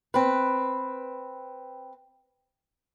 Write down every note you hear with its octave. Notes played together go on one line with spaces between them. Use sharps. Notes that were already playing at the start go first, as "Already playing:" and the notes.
C4 B4